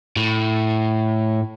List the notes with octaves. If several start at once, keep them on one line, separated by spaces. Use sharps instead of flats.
A2